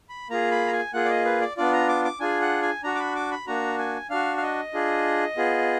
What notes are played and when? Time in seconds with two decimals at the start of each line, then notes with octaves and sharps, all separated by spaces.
0.09 B5
0.30 A#3 F4 G#4 A#5
0.52 B5
0.67 A#5
0.72 G#5
0.93 A#3 F4 G#4 F#5
1.05 D5
1.09 D#5
1.25 B4
1.41 D5
1.57 B3 D4 F4 D5
1.73 A#5
1.89 D6
2.05 D6
2.20 D4 F4 G#4 G#5
2.41 F#5
2.62 G#5
2.83 D4 F#4 A#5
2.95 D6
2.99 B5
3.16 D6
3.31 B5
3.47 A#3 D4 F#4 A#5
3.79 G#5
4.10 D4 F#4 F5
4.37 F5
4.42 D#5
4.74 D4 F4 G#4
5.37 B3 F4 G#4